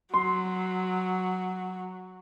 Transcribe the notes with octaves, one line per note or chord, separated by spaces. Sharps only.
F#3 C6